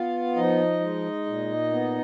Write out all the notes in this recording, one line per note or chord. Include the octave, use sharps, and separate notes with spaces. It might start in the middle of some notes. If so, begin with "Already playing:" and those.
Already playing: B3 F4 F5
F3 D#4 D#5
G#3
A#2
B3